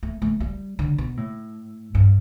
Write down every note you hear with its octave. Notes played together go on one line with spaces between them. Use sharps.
A3
A3
G3
D3
B2
A2
G2